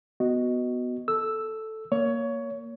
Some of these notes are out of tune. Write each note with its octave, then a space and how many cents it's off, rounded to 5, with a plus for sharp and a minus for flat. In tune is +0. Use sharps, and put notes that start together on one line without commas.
B3 +0 F#4 +0 D#5 +0
A4 +0 E6 +0
A#3 +0 C#5 +20